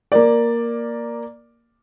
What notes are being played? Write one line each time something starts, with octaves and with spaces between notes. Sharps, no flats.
A#3 A#4 D5